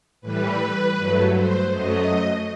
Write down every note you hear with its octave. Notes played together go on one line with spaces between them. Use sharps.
A2 E3 G3 B4
G2 F#3 A3
C5
F#2 F#3 A3 D#5